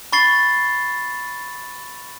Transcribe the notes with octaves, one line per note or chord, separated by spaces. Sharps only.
B5 C#6 A6 C7 G7